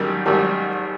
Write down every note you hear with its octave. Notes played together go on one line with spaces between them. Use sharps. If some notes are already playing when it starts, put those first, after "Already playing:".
Already playing: G#1 F#2 D#3 G3
G#1 F#2 D#3 G3